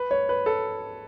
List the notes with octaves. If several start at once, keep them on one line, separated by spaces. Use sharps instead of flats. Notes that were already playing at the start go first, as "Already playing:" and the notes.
Already playing: B4
C#5
B4
A4